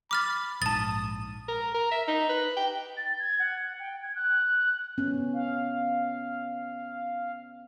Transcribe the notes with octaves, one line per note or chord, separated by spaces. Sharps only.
B5 D6 F6 A6
A#1 G#2 A5 D#6 A6
A#4
A#4
E5
D#4
B4
G5
A6
G#6
F#5
G5
G#6
F#6
B3 C#4
F5